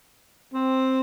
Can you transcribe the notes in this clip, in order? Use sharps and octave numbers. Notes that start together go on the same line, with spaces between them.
C4